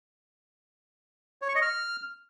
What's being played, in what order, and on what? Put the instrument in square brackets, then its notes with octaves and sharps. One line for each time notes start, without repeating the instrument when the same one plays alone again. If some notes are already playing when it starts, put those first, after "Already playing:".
[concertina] C#5
C#6
D#5
F6